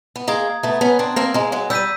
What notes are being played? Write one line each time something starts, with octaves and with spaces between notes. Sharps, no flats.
B3
G#3 A#3 A#5 D#6 G#6
A3 B3
B3 C#4
C4 D4
A#3 C4
G#3 A#3
F#3 G#3
G3 E6 G6 B6 D#7